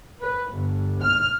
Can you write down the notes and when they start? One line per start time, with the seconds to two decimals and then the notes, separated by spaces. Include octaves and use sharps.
0.22 B4
0.53 G1
1.02 F6